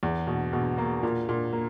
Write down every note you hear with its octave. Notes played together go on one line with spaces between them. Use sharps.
E2
B2
B2
A#3
A#2
A#2
A#3